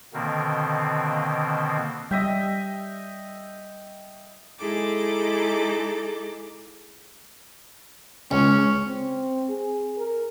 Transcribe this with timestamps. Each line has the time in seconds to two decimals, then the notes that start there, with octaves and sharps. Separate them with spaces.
0.14 B2 D3 D#3 A#3 C4
2.11 G3 D#5 E5 G5
4.58 G#3 D#4 E4 G#4 A4 D6
8.31 C#2 C#4
8.87 C4
9.49 G#4
9.98 A#4